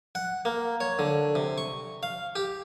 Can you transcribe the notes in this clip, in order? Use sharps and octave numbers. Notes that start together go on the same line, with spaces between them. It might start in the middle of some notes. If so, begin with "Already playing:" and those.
F#5
A#3
C#5
D3
C3
C#6
F5
G4